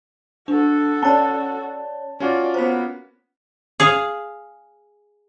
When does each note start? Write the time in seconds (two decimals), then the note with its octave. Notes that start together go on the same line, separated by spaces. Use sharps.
0.48 D4 F#4 A4
1.03 C#4 C#5 D5 A5
2.20 C#4 F4 F#4 D5
2.54 A#3 B3 C5 B6
3.80 G#4 F5